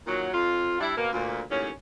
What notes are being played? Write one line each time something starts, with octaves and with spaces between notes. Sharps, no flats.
A#2 D#3 F#3
F2 F4
G3 D4 E4
B2 A#3
D2 A#2
D#2 A2 F#3 C#4